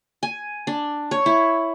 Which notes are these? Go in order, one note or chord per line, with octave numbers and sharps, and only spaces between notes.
G#5
D4
C#5
E4